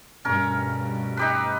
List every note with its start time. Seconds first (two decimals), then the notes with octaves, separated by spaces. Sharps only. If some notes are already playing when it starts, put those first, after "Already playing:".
0.25 G2 B2 A3 C#4 A#4
1.17 D#4 G4 B4